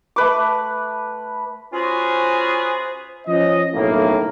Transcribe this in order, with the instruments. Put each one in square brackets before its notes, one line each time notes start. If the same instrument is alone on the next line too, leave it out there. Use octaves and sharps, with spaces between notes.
[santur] A3 B4 D6
[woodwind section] C#4 F4 F#4 G#4 B4 C5
[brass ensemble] F3 C#4 D#5
B1 A2 C#3 A#3